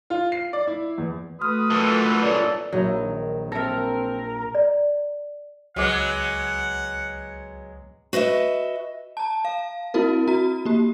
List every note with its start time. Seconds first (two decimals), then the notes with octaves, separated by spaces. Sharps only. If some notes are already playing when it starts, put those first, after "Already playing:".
0.10 F4
0.32 C7
0.53 D5
0.67 E4
0.98 E2
1.41 A3 F#4 B4 C6 D#6 F6
1.71 A#2 E3 A4
2.23 G1 C#4 A4 D5 A#5
2.72 A#1 F#3 D#4 E4 A#6
2.98 D#3
3.52 C4 A4 A#4 E5
4.55 D5
5.76 C#2 F#3 G#3 B3 F#5 D6
8.13 F#4 B4 D#5 E5
9.17 A5 A#5
9.45 F5
9.94 C4 E4 F#4 A#4
10.28 F#4 A#5
10.65 A#3 G4